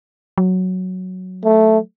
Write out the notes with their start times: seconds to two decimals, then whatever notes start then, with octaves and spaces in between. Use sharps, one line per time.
0.38 F#3
1.45 A3